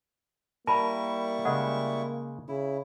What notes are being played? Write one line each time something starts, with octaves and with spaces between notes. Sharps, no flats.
G3 A#3 E4 A#4 A5 B5 C#6
C#3 G#3 A4 D#5 F#5
C#3 E4